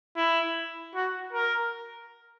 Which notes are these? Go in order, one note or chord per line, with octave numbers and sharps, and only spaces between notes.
E4
F#4
A#4